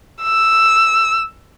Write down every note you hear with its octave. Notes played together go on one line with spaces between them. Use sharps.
E6